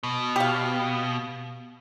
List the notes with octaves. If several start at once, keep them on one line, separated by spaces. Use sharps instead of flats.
B2
G4 F5